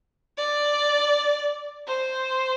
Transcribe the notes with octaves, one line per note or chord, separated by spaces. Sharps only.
D5
C5